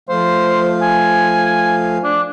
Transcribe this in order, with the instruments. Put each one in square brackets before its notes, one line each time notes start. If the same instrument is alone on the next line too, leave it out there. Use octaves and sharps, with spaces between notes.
[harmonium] F3 A3 F5 [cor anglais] C5
[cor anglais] G#5
D4